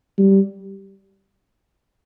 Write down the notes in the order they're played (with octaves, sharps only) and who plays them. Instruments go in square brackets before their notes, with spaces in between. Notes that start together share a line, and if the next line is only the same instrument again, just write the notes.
[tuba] G3